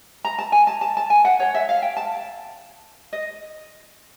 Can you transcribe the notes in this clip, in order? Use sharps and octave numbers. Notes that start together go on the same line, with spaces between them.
A#5
A5
G#5
A5
A5
A5
G#5
F#5
C#5
E5
F5
G5
A5
D#5